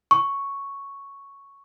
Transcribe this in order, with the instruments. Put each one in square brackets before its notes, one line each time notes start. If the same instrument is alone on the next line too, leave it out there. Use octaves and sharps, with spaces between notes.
[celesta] C#6